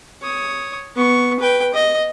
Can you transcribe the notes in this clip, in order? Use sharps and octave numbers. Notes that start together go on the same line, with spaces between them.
C#5 D#6
B3 C#6
B4 G5
D#5